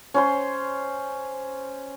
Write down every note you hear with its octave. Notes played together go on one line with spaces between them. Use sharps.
C#4 C5 C6